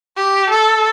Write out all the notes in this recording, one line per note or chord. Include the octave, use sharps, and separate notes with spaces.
G4
A4